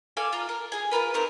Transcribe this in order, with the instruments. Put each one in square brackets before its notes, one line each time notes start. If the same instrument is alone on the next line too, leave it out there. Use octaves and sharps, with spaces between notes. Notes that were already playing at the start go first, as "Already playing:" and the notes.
[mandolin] A4 D5 F5 G#5
F4 A#5
A#4
G#4 G#5
F4 F#4 A#4 B4
A#3 C4 D#4 A#4